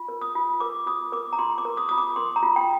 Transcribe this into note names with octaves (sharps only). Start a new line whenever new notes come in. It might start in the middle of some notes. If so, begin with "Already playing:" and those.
Already playing: F4
A#4
D#6
F4
A#4 D6
F4 D#6
A#4 D6
A#5
F4 C6
D6
A#4
D#6
F4 D#6
D6
A#4 C6
A#5
F4
G5